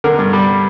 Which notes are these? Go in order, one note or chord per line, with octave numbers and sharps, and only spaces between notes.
D3 A#4
G2
G3